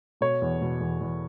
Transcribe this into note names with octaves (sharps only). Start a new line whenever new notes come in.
B2 C#5
E2
B2
E2
E2